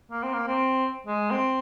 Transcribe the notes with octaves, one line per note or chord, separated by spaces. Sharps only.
A#3
C4
A#3
C4
G#3
C4